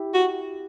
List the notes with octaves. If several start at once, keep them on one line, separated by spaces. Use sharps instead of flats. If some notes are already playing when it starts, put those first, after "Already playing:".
Already playing: E4 G4
F#4